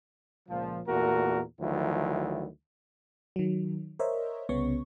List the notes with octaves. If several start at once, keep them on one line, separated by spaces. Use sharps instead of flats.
C#2 A#2 F3
E2 A#2 A3 F#4 A#4
D2 D#3 F3 F#3 E4
D#3 F#3
A#4 C5 C#5 D#5 E5
C2 C#3 B3 C#5 C#6